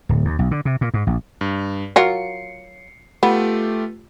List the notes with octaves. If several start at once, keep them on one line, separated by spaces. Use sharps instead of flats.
D1
D#2
B1
D3
C3
A#2
G#2
A#1
G2
F#3 F4 A#4 C7 C#7
A3 B3 F4 G4